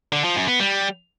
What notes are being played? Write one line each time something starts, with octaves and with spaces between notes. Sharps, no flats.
D3
F3
F#2
B3
G3